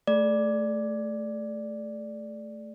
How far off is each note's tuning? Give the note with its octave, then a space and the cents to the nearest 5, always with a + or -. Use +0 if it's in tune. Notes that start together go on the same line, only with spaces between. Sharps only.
A3 +0 G#4 +45 D5 +0